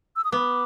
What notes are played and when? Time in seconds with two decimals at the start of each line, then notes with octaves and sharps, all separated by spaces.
0.16 E6
0.24 D#6
0.32 B3 D6